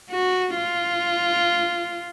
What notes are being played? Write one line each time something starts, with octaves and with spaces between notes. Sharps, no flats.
F#4
F4